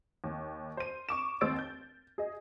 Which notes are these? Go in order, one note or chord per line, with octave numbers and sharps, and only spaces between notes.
D#2
C5 D#7
C#6 D6 E7
D#2 G#3 C4 E6 A6 D7
G6
G#4 D#5